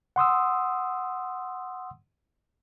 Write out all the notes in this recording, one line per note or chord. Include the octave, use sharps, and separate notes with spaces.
F#5 C6 D#6 E6